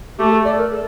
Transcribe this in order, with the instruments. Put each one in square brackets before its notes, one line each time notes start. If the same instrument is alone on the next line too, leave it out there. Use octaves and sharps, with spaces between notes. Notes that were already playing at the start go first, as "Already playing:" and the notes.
[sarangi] A3 [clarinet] G4
[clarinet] A4
D5
A#4
A4